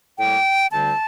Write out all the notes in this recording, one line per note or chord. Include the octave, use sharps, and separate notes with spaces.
A2 G3 A#3 G5
D2 D3 G3 C4 A5